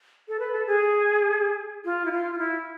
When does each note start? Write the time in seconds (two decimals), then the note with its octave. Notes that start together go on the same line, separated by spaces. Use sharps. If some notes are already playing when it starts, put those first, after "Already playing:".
0.28 A4
0.39 B4
0.52 A4
0.67 G#4
1.85 F4
2.06 E4
2.12 F4
2.33 F4
2.38 E4